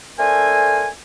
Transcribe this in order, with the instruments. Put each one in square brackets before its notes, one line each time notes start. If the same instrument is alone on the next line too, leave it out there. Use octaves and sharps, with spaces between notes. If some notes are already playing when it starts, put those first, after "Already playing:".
[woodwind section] A3 D4 A4 A#4 C5 G#5